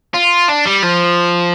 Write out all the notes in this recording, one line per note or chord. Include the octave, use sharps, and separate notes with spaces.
F4
D4
G3
F3